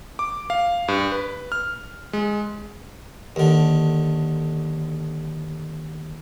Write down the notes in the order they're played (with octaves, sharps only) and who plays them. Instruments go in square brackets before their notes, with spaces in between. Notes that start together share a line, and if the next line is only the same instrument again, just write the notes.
[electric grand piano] D6
F5
G2
B4
F6
G#3
[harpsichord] D#2 D3